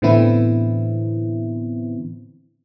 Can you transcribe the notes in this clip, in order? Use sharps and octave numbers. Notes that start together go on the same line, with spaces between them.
A2 D3 E3 B3 C4 E4